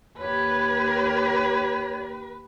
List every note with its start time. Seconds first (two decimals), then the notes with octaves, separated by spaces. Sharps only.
0.19 D#2 G4 B4 C#5